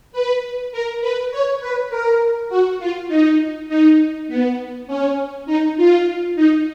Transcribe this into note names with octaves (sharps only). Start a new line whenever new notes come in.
B4
A#4
B4
C#5
B4
A#4
F#4
F4
D#4
D#4
B3
C#4
D#4
F4
D#4